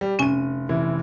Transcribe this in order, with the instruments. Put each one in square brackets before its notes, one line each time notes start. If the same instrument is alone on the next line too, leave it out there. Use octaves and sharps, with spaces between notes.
[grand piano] G3
[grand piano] F1 D#7 [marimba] C#4 G#5
[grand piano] F1 E3 E4